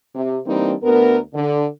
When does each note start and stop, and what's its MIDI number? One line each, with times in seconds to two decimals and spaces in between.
0.15 0.39 48
0.46 0.74 52
0.46 0.74 55
0.46 0.74 58
0.46 0.74 60
0.46 0.74 62
0.46 0.74 63
0.83 1.19 38
0.83 1.19 59
0.83 1.19 70
1.34 1.66 50